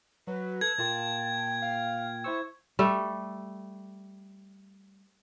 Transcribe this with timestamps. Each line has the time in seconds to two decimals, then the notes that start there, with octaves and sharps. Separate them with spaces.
0.27 F#3 B4
0.61 A4 G#6
0.78 A#2 A#3 F4 G5 A5
1.62 F5
2.24 E4 C5 C#6 E6
2.79 G3 A3